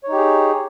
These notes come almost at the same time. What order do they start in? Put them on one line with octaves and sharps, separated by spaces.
C#5 D#4 G4 G#4